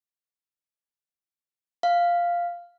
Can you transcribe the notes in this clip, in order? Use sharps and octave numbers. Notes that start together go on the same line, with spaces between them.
F5